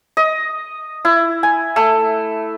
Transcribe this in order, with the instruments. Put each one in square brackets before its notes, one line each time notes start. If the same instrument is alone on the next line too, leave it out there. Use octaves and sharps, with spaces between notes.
[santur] D#5
E4
G#5
A3